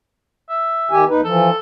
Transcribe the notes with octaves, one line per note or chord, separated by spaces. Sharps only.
E5
D#3 G4 G#5
D#2 D#4 B4
E3 F3 A4